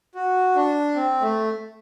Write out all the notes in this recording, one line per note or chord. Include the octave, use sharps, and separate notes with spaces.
F#4
D4
C4
A3